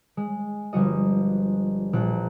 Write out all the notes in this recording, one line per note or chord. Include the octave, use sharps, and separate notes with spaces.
G#3
G1 F3 G3 F#4 D#5
E1 A#1 A#3 F#6